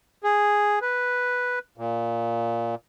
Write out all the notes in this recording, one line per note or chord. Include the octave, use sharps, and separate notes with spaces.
G#4
B4
A#2